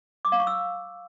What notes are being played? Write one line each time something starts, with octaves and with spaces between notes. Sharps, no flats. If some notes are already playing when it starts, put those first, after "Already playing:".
D6
F5
C#6
E6